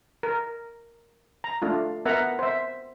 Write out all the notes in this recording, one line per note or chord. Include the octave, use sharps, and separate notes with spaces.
A#4
A#5
A3 D4 F4
B3 A#4 E5 F#5 A#5
C5 E5